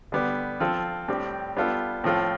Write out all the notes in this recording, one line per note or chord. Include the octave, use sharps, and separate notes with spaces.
D3 G3 B3
F3 C4 F4 A4
A2 G3 C4 G4
G3 B3 F4 A4
A2 F3 C4 F4 A4